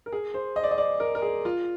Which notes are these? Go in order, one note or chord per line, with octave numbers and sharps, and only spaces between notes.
A#4
G#4
C5
D#5
D5
D#5
D5
A#4
A#4
G#4
F4